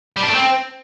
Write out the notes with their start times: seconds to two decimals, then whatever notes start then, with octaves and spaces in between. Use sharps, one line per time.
0.16 G3
0.22 D4
0.29 A3
0.35 C4